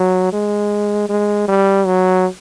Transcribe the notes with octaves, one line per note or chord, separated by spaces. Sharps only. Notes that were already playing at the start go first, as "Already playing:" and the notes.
Already playing: F#3
G#3
G#3
G3
F#3